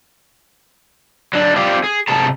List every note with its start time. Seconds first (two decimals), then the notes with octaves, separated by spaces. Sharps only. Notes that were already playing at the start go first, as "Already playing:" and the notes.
1.33 F#3 D4
1.56 C4 F4 G4 D5
1.84 G#4
2.08 A2 C3 G#4 A5 A#5